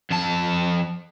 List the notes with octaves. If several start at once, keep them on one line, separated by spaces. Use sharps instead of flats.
F2 A5